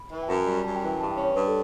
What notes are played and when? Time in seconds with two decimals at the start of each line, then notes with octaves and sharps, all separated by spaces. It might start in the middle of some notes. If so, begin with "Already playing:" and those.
Already playing: B5
0.11 E3
0.22 G5
0.28 F#2 A5
0.46 G3
0.63 F#2 A5
0.76 G5
0.82 E3
0.88 G5
1.00 G2 A5
1.11 G5
1.17 C#4
1.23 C#5
1.35 G2 B4
1.48 A4